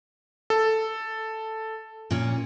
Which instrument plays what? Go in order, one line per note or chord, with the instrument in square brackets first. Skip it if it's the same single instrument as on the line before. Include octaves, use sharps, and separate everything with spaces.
[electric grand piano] A4
[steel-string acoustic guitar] A#2 C#4